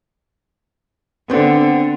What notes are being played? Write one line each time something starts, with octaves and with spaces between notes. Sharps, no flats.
D3 B3 C4